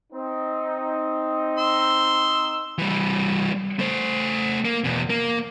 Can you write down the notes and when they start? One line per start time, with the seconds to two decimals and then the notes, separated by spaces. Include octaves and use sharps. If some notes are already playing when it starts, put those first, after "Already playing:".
0.13 C4 D#4
1.58 C6 E6
2.79 E3 G3
3.79 A3 C5
4.65 A#3
4.84 E2 B2
5.10 A#3